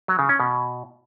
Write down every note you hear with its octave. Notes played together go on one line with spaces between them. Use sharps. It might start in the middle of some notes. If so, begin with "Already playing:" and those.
F#3
C#3
C#4
B2